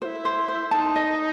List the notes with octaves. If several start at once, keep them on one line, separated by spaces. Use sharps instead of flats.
E4 F#4 C5
C5
C5
D#4 A5
D#5